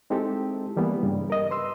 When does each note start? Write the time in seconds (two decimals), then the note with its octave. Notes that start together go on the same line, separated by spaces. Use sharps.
0.10 G#3 C4 D#4 E4 G4 A4
0.76 E3 G3 A#3 B3
1.03 G2 C#3 G3
1.30 A#4 D#5
1.51 B4 C6 E6